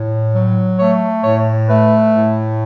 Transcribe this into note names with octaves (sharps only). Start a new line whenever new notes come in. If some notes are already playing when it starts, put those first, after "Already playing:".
Already playing: A2
F#3
A3 C#5
A2 C#5
A3 B4
A2